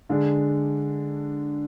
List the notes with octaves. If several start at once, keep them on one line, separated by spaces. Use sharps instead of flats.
D3 G#3 D4